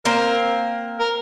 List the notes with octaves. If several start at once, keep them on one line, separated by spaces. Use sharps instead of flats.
A#3 C4 A#4
A#4